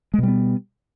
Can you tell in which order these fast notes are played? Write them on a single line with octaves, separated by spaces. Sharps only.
G#3 B2 G3 B3